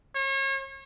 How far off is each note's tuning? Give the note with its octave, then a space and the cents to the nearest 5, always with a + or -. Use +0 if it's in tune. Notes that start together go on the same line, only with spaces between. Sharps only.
C#5 -35